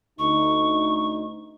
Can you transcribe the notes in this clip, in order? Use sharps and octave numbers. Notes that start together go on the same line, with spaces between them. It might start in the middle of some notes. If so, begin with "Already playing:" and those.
D2 D#4 C#6